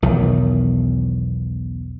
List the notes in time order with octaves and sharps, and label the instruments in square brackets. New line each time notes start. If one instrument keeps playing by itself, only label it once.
[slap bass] B1 E2 D#3